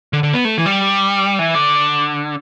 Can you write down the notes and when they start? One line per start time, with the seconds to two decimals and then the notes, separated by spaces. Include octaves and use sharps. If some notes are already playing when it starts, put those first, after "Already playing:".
0.13 D3
0.23 D3
0.34 B3
0.45 A3
0.58 E3
0.66 G3
1.39 E3
1.55 D3